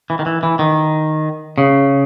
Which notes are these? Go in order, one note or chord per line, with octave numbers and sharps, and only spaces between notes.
E3
D#3
E3
E3
D#3
C#3